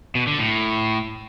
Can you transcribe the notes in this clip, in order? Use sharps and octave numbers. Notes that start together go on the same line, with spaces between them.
B2
D3
A2